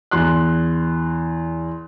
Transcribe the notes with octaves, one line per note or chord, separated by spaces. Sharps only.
E2 C6 F#6